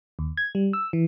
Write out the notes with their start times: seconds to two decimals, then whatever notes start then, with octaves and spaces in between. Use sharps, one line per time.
0.19 D#2
0.37 G#6
0.55 G3
0.73 E6
0.93 E3